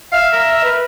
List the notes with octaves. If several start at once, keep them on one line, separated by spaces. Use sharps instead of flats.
E5 F5
A#4
B4